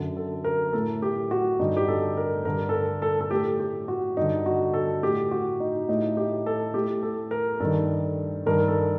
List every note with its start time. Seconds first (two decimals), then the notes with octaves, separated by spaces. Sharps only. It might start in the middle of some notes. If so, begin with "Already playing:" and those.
Already playing: F#2 D3
0.17 A4
0.44 A#4
0.73 A2 A4
1.02 G4
1.31 F#4
1.59 G2 D3 D#4
1.77 G4
1.88 A4
2.17 A#4
2.45 G2 D3 A#4
2.69 A4
2.74 A#4
3.02 A4
3.21 A4
3.31 A2 G4
3.60 G4
3.88 F#4
4.17 G2 D#4
4.21 D3
4.46 F#4
4.74 A4
5.03 A2 G4
5.31 F#4
5.60 D#4
5.88 A2 D#4
6.17 G4
6.46 A4
6.74 A2 G4
7.03 A4
7.31 A#4
7.60 G2 D#3 A4
8.46 G2 D#3 A#4
8.68 A4